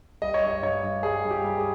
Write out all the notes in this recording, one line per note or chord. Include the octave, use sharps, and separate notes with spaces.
G3 D#5
C#5
G2 D#5
G2 C#5
G2
G3 G#4
G2
G4
G3
G#4